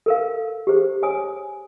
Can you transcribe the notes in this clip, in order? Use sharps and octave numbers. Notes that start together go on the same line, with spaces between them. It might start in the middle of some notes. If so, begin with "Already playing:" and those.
A4 A#4 F5
G4 G#4 C5
C#5 G#5 D#6